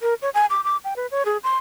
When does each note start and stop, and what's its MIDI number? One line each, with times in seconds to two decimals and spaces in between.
0.01 0.14 70
0.22 0.30 73
0.34 0.46 80
0.50 0.61 86
0.64 0.77 86
0.84 0.94 79
0.96 1.07 71
1.11 1.23 73
1.26 1.37 68
1.43 1.57 84